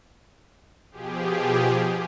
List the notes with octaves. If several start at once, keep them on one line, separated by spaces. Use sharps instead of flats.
B2 F3 G4 G#4